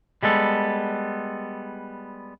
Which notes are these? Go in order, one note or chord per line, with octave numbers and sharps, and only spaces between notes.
G3 G#3 B3 A4